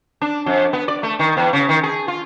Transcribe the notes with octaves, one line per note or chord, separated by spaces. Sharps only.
D4
F2
B3
D5
A3
D#3
E2
C#3
D#3
G#4
F4